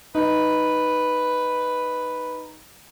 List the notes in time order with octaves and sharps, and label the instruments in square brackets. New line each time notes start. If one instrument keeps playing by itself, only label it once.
[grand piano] D#4 [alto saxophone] B4